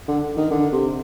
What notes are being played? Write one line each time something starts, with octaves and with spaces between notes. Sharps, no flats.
D3
D#3
D3
C3